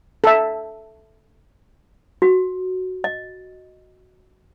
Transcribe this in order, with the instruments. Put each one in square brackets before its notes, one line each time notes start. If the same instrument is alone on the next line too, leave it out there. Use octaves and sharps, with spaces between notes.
[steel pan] A4 E5
[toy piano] F#4
D#5